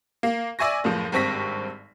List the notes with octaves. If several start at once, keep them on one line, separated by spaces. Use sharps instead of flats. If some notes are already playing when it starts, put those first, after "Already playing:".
A#3
D5 E5 G#5 C#6 A#6
F#1 A2 F3
G#1 G2 C4 C#6 A#6 B6